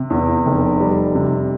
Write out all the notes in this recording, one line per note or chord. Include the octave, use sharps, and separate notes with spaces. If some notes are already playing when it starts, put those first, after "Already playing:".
Already playing: C3
E2
F1
G3
C3